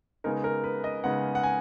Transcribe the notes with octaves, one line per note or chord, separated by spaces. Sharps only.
C#3 G#3 B3 D#4 A#4
A#4
B4
D#5
C#3 G#3 B3 D#4 F#5
F#5
G#5